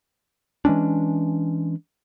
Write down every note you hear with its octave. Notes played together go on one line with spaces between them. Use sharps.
E3 G#3 C#4 D4